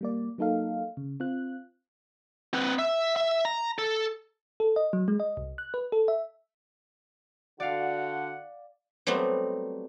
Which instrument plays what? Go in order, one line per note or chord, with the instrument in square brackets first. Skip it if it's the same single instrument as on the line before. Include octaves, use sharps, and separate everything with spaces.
[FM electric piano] G3 A#3 D5
F#3 A#3 D#4 A4 F5
C#3
C4 F4 F#6
[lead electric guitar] C4 B4
E5
E5
A#5
A4
[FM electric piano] A4
D#5
F#3
G#3
D#5
C2
F#6
B4
A4
E5
[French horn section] D3 F#4 [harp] D5 F5 [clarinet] F#5
[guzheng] F#3 G3 A3 B3 C4